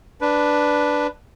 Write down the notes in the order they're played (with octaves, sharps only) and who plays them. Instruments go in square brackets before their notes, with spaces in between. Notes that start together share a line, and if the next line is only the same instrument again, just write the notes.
[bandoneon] D4 B4